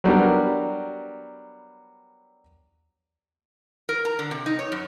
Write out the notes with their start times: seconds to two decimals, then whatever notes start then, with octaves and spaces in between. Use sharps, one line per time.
0.04 F#3 G3 B3 D4 A#4
3.89 A#4
4.05 A#5
4.19 D3
4.31 C3
4.46 D#4
4.59 C#5
4.72 F#2